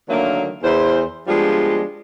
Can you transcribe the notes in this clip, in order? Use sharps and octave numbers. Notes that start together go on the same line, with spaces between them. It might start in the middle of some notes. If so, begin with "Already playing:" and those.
D3 D#3 F#3 A3 A#3
E2 C5
F3 G3 G#3 B3 D4 F4